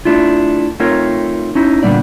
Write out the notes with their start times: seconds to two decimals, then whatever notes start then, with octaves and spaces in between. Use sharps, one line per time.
0.05 A3 D4 E4 F4
0.80 A3 C4 D#4 F4 A#4 C#5
1.55 C#4 D#4 E4
1.83 A#2 D3 E3 G3 B3 D5